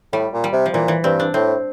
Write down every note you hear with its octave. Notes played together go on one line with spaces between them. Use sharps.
A2 G3
A#2
G3
C3
F3
A#2 E3
E3
G2 C4
D4
A2 C4